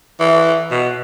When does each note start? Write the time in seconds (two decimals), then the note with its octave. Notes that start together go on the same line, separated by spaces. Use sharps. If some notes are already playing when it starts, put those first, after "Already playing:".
0.20 E3
0.71 B2